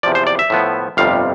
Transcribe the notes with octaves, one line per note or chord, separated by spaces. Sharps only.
E2 C3 F3 D5
C5
D5
E5
A2 F3 B3
G1 F2 C3 G3 F5